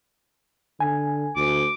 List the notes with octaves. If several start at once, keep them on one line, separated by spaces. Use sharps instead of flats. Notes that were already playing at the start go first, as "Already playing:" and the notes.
D3 G#5
D2 D6